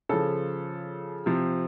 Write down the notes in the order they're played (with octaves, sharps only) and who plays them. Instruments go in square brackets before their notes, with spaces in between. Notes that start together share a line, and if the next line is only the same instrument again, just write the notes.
[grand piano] C#3 F3 A4
C3 F3